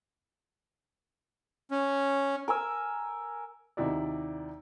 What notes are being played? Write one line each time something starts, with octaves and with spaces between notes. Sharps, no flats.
C#4
A#4 G#5 E6
D#2 C3 D#4 E4 F#4 D5